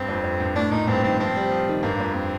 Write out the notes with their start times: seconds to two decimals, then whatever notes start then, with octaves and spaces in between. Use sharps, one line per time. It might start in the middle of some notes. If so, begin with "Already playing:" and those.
Already playing: G2 C4
0.09 F2
0.24 F2
0.40 G2
0.56 A2 D4
0.71 A#2 D#4
0.87 G2 C4
1.04 D#3 C4
1.20 F3 C4
1.35 G3
1.51 F3
1.68 D#3
1.83 G2 A#3
2.00 F2
2.15 C4